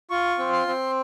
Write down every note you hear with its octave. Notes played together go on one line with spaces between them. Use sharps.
F4 C#6
C4
C6
C4